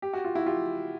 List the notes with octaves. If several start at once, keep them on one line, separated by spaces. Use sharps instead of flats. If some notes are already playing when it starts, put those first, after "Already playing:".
G4
F#4
F4
E4 F#4
F4 G4